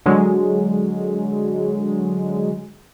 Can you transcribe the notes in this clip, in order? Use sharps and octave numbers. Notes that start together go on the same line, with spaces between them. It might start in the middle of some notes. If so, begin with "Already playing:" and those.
D3 F#3 G#3